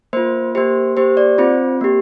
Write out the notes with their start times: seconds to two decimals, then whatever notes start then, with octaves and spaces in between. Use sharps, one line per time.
0.13 A#3 F4 C5
0.55 A#3 G4 C5
0.97 A#3 G4 C5
1.17 D5
1.38 C4 F4 C5
1.81 A#3 G4